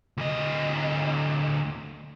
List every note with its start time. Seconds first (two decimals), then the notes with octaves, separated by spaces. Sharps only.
0.17 D2 D#5